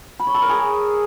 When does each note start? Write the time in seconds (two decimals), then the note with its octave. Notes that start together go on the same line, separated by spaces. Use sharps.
0.20 B5
0.27 C#5
0.34 A4
0.42 A#4
0.49 G#4